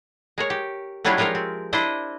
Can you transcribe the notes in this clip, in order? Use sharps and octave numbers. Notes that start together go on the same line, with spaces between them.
G#3 A#4 C#5
G4
F#3 G3 C#4 D4 E4 F4
F3 G#3 F4 G4 A#4 C#5
C4
D4 E4 C5 D#5